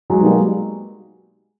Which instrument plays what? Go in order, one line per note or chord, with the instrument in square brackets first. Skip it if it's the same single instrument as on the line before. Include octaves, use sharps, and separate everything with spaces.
[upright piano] F#3 G#3
[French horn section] B2 G3 A#3 D#4